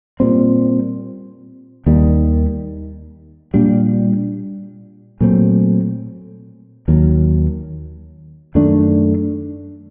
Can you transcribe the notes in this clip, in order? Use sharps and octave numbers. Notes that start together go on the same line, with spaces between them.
A#2 G3 C4
D#2 D#3 G3
A#2 G3 D4
A#2 F#3 A3 C4
D#2 D#3 F#3
F#2 D#3 A3 D4